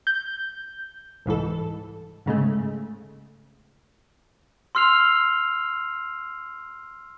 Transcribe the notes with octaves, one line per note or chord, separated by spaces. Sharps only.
G6
C2 G#2 E3 A4
G#2 C#3 G#3 A3
C6 E6 F6 C7 F7